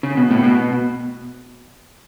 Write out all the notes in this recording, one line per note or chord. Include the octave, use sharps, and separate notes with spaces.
C#3
B2
A2
B2